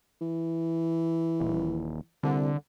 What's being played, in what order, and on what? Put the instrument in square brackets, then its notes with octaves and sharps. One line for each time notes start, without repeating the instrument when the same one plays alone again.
[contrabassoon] E3
[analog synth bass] D#1
[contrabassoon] C2 [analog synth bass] D3